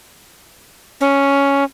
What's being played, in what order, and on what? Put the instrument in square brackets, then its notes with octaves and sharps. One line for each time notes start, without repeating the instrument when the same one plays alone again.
[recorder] C#4